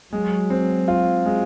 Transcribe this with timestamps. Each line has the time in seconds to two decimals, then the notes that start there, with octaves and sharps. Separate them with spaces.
0.13 F#3 G#3
0.50 C4
0.88 F4
1.25 G#3